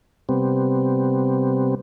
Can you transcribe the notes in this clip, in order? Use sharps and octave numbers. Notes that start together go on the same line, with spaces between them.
C3 G3 B3 C4